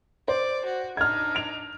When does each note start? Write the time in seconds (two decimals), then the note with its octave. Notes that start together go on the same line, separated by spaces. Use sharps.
0.28 C5 D5
0.66 F#4
0.97 D4 D#4 F6 G#6
1.35 D7 F7